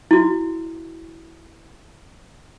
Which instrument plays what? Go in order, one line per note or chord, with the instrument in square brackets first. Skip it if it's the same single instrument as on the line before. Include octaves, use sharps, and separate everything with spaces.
[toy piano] E4 F#4